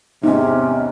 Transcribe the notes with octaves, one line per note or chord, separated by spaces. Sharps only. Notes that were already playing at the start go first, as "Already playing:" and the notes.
E2 G#2 C3 C#4 D#4 G#5